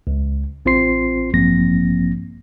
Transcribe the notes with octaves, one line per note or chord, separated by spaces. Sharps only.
C#2
A1 C4 F4 C5 C6 C7
A1 G2 F3 A#3 C4 A#6